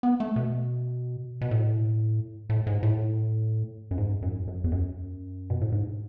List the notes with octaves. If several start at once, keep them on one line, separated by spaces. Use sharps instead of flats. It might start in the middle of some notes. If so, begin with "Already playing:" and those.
B3
A3
B2
B2
A2
A2
G#2
A2
F#2
G#2
F#2
F#2
E2
F#2
B2
A2
G#2